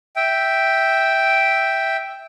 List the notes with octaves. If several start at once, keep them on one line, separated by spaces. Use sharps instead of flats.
E5 G5